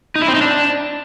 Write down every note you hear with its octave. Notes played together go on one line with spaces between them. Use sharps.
D#4
E4
C4
D#4
D4